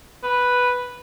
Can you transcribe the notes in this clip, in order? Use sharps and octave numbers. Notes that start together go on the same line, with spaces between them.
B4